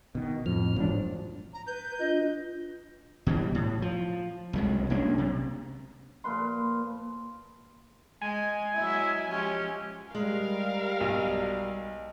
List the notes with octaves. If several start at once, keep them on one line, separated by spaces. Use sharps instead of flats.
B2 D#3
F2 A2 F3 F6
E1 E2 G#2 F3 F#3 D4
A#5
B4 G6
D4 F4 D#5
B2 E3 G3
A2
F3
C2 F#3 G#3
B1 A#3 C#4 D4
C3
A#2 F3 B4 C6
G#3 G#5
F#3 G#3 E4 E5
F3 G#3 C#4 G4
G3 G#3 A#4 F5
B1